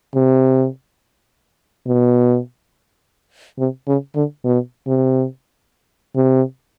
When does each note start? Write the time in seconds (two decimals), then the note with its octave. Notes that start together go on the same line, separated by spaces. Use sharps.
0.15 C3
1.87 B2
3.58 C3
3.87 C#3
4.15 D3
4.45 B2
4.87 C3
6.16 C3